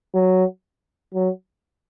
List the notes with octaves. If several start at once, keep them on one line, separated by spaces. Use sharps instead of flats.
F#3
F#3